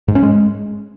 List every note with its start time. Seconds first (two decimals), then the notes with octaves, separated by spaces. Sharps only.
0.08 G#2
0.15 C#4
0.23 G#3